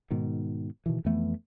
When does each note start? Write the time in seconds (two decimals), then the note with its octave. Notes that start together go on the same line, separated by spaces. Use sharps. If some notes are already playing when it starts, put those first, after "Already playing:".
0.11 G#2 B2 D#3
0.86 B2 D#3 E3
1.05 F2 E3 A3 B3